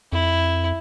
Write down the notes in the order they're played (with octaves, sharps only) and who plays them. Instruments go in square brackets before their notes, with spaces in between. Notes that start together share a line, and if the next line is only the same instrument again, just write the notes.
[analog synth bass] F2 [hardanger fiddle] E4